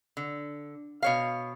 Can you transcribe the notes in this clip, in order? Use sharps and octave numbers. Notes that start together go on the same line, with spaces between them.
D3
B2 C#5 F5